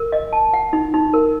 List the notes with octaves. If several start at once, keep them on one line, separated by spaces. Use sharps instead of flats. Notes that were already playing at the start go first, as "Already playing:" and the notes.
Already playing: A#4
D#5
A5
F#5
D#4
D#4
A#4